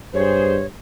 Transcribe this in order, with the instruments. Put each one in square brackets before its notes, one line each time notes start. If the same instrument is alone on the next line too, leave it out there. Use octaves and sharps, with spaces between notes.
[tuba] G2 [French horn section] G#4 C5 [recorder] C#5